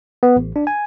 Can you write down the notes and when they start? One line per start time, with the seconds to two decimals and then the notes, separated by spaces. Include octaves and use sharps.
0.23 B3
0.36 A1
0.56 D4
0.67 G#5